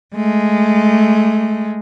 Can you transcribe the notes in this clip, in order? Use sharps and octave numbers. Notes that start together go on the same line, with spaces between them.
G#3 A3